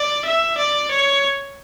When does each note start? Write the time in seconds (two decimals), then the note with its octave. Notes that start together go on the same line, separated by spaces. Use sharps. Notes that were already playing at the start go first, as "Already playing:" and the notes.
Already playing: D5
0.25 E5
0.58 D5
0.91 C#5